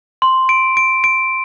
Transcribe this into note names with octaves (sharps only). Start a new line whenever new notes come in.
C6
D7
D7
D7